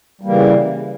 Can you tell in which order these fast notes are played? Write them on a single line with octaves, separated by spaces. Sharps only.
G3 A#3 E3 C#3